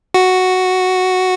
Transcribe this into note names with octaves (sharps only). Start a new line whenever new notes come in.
F#4